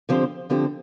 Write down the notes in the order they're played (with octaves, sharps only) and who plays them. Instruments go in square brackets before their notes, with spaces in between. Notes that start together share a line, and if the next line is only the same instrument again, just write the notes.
[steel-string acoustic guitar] D3 F3 C4 G4 C5
D3 F3 C4 G4 C5